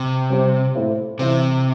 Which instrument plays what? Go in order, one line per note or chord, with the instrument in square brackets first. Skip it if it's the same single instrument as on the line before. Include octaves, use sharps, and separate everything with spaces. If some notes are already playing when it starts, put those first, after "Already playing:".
Already playing: [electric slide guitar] C3
[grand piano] G3 C4 G4 C5
A2 A3 E4 C5
[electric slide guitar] C3 [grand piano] E3 C4 E4